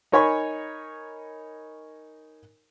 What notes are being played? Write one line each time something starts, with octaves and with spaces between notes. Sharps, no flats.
D#4 A#4 C#5 G#5 B5 C#6